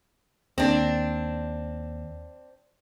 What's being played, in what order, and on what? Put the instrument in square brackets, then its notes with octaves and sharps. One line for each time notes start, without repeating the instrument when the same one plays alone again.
[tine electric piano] D#2 [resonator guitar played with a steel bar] C4 D4